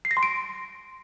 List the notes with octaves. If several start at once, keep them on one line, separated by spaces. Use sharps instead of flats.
C7
A#6
C6
D7